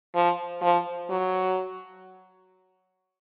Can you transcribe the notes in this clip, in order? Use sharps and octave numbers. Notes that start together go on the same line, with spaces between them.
F3
F3
F#3